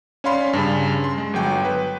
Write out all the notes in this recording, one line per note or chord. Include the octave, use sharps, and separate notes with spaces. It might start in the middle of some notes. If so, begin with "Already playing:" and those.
C#4 C#5 D5 F5 B5 C6
G2 C#3
C6
G#3
G1 F#3 G5
B4